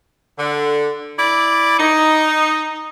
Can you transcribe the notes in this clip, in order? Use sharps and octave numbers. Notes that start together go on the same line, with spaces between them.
D3
E4 D5
D#4